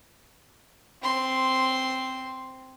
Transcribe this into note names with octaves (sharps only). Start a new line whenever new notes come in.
C4 C6